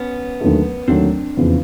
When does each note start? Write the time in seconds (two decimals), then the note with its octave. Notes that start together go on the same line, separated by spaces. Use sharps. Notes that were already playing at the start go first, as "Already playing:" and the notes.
Already playing: B3 C#4
0.41 D#2 D3 F#3 A3
0.88 D#2 D3 F#3 A3 C4 D4
1.37 F1 E2 C#3 F3